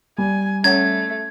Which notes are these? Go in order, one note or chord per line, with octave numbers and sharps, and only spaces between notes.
G3 G#5
A3 C#4 C#5 F#5 G#6